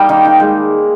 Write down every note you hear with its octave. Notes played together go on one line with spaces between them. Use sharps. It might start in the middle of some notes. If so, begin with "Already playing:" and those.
Already playing: G3 A#3 D#4 G5
D#3
D#3
G#3